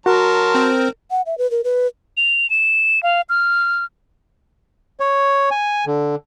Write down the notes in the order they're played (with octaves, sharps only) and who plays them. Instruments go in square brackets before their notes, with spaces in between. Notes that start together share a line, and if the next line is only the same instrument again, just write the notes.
[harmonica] F#3 A5 C6 [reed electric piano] F#4 [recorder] A#4
[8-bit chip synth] C4
[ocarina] F#5
E5
B4
A#4
B4
[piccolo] F7
E7
F5
F6
[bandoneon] C#5
G#5
D3